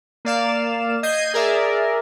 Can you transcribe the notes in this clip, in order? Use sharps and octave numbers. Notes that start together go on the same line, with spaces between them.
A#3 D5 F5 E7
D#5 G6 G#6 C7 D#7
G#4 A#4 D5 E5